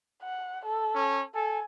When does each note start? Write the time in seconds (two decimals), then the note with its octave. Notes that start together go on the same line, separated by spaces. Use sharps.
0.23 F#5
0.65 A4
0.95 C#4
1.35 A4 G#5